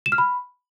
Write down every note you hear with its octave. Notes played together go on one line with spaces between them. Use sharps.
E7
F6
B5